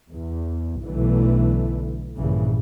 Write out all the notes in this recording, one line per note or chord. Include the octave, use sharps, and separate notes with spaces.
E2
B1 D3 E3 A3
A#1 G2 C#3 E3